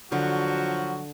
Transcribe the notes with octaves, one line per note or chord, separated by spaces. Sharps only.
D3 F3 F#3 F#4